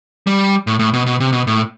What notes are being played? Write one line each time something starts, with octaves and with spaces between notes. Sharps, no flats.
G3
A2
A2
B2
B2
C3
B2
A2